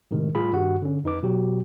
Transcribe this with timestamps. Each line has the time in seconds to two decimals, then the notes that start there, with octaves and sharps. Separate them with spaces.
0.11 A2 C3 D#3 G#3
0.35 A2 G3 F4 G#4 B5
0.53 G2 D#3 F#4 G4 F#5
0.82 D3 C#4
1.04 F2 D#4 B4 D6
1.23 B2 F#3 F#4 G4